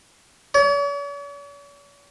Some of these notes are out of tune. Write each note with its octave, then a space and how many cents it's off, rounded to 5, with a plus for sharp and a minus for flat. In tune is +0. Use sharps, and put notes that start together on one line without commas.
C#5 +45